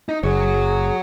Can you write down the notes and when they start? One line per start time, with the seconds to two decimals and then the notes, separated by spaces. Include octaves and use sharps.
0.09 D#4
0.23 F#1 F#4 G#4 C#5